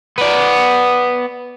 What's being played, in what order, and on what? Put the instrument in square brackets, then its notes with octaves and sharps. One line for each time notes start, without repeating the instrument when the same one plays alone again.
[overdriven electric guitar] B3 D5